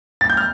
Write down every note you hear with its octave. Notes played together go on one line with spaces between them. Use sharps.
A6
G6
F6